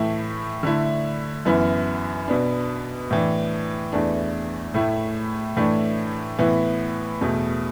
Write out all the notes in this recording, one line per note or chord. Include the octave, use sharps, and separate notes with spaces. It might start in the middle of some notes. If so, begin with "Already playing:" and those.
Already playing: A2 E3 A3 E4
D3 A3 E4
F#2 E3 B3 E4
B2 B3 D4
A2 E3 D4
E2 E3 A3 D4
A2 A3 E4
A2 E3 A3 D4
A2 E3 B3 E4
E2 B2 A3